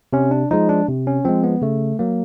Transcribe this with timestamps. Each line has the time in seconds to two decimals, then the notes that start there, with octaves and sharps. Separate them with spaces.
0.13 C3 C#4
0.31 D4
0.51 F3 G#3 D#4
0.69 D4
0.88 C3
1.07 C#4
1.25 F3 G#3 C4
1.44 B3
1.62 C#3 A3
1.99 F#3 A#3